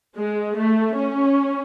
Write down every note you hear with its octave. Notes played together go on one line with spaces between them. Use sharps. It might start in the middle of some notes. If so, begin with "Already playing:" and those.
G#3
A3
C#4